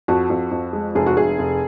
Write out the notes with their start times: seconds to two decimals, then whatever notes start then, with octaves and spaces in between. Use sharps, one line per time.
0.08 F2 F#4
0.30 F2
0.51 F2
0.73 G#3
0.95 F1 G#4
1.06 F#4
1.17 F1 G#4
1.39 F1